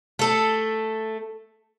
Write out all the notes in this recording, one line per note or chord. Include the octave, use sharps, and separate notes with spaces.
A3 A4